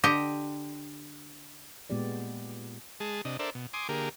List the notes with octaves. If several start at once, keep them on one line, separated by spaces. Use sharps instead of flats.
D3 G4 D#5
A#2 G#3 B3 G4 D5
G#3 G#4 A5
C3 D4 D#5
D4 A4 A#4 C5 D5 E5
B2
G#5 C6 D6 D#6
D3 A#3 G4 G#4 A#4